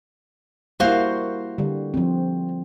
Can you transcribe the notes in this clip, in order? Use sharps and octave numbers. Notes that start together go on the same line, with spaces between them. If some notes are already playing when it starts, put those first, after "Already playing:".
G3 A#3 E4 F#4 C5 F5
D3 G3
F3 C4